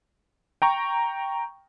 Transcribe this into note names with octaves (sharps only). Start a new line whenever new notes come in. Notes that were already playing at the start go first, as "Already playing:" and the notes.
G5 A#5 C#6